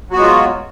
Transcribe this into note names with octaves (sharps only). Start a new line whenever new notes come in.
F#3 G#3 B3 F4 F#4